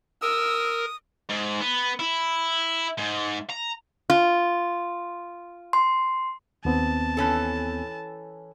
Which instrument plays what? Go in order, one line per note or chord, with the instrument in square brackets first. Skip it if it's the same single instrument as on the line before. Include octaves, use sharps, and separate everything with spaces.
[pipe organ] A#4 [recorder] D#6 [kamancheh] E6
[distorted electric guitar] G#2
B3
E4
G#2
A#5
[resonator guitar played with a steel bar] F4
[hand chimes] C6
[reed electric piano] D#2 B3 C4 [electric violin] A5
[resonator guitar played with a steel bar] E3 C#4 A4